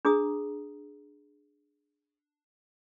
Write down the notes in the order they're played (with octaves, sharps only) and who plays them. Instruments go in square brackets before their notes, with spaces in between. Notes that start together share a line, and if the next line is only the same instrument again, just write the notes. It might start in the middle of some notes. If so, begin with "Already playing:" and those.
[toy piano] D4 G#4 A#5 D#6